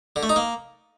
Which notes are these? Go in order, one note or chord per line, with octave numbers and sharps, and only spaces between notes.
D3
A3
D#4
A#3